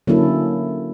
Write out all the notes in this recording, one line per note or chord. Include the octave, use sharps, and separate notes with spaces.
D3 F#3 A#3 C#4 E4 A4